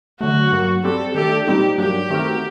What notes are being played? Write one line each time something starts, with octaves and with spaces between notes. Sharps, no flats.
D3 F#3 A3 F#4
G2 F#3 A#3
G3 C4 G4 A4
D#3 A3 D4 G4 A4 D5
A#2 G3 C4 D#4 G4
G2 F#3 A#3 D4 G4
D#3 A3 C4 F#4 A#4